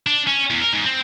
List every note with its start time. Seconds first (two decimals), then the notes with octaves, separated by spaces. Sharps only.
0.07 D4
0.27 C#4
0.50 E2
0.61 A#4
0.73 G#2
0.85 C4